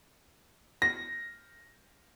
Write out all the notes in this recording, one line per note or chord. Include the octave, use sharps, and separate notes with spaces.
A#6